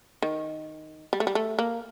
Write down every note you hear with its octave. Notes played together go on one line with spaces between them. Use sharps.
D#3
G3
A3
G3
A3
A#3